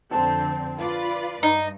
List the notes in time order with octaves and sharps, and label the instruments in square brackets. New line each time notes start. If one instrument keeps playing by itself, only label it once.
[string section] F2 D3 C4 [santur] A5
[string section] F4 B4 D5
[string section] G2 [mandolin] D#4